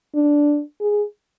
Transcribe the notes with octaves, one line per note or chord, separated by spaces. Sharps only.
D4
G#4